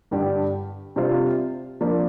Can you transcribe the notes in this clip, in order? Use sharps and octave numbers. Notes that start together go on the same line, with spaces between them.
G2 D3 G3 D4 G4
C3 G3 D4 F4 C5
F3 A#3 D4